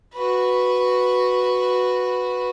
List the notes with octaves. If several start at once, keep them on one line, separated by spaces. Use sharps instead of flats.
F#4 B4